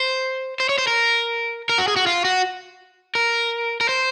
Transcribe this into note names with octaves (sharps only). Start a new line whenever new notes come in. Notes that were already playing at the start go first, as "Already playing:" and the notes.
Already playing: C5
C5
C#5
C5
A#4
A#4
F#4
G#4
F#4
F4
F#4
A#4
A#4
C5